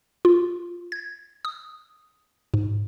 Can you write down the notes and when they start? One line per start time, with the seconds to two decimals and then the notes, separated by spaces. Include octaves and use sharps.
0.25 F4
0.92 G#6
1.45 D#6
2.54 G#2